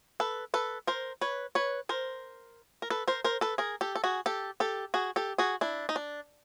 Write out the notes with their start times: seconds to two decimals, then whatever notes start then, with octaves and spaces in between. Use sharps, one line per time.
0.20 A4 B4
0.54 A4 B4
0.87 A#4 C5
1.21 B4 C#5
1.55 B4 C#5
1.89 A#4 C5
2.82 A#4
2.90 A4 B4
3.08 A#4 C5
3.24 A#4 C5
3.41 A4 B4
3.58 G#4 A#4
3.81 G4 A4
3.96 A4
4.04 F#4 G#4
4.26 G4 A4
4.60 G4 A4
4.94 F#4 G#4
5.16 G4 A4
5.38 F#4 G#4
5.61 D4 E4
5.89 D#4
5.96 D4